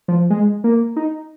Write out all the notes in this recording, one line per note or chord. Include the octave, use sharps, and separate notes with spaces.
F3
G#3
A#3
D#4